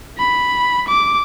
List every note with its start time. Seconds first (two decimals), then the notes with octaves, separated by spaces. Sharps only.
0.18 B5
0.88 D6